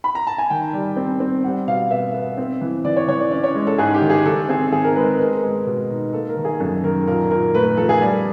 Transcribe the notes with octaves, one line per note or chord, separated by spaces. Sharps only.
B5
A#5
A5
G#5
D#3 G5
G3
C4
C4
G3 F#5
B2 F5
B3 E5
B3
C4
E3
E3 D5
C#5
E3 C#5
D5
C#4 D5
C#5
G#3
A4
G#2 G#4
G4
D#3
G#4
D#3 A4
C4 G#4
D#3 G#4
A#4
G#3 B4
B3 A#4
G#3
B2
D#4
A#3 A4
A#4
D#3
G#4
F#2 A4
D#3 A#4
A#2 A#4
A#2 A#4
A3 B4
A#4
F3 A4
G#4
G3